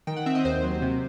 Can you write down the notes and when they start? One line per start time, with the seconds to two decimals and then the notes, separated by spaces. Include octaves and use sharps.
0.07 D#3 G5
0.17 F#5
0.26 C4 E5
0.35 D#5
0.45 D#2 C5
0.63 F#3
0.82 C3